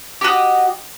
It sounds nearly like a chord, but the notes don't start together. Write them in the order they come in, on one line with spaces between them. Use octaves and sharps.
G4 F#4 D#5